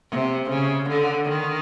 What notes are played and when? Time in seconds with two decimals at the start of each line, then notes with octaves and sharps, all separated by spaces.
0.11 C3
0.49 C#3
0.89 D3
1.29 D#3